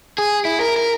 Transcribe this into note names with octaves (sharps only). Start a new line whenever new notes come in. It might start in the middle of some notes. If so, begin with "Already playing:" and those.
G#4
E4
A#4
A#4